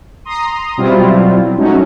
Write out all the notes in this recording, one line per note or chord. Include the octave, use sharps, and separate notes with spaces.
A#5 C6 D#6
B2 F#3 G3 C4 E4 F4
F#3 G#3 A3 C#4 D#4 F#4